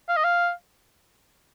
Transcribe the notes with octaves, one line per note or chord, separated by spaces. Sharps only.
F5
D#5
F5